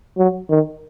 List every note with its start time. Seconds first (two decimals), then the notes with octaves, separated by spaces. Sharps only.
0.18 F#3
0.50 D#3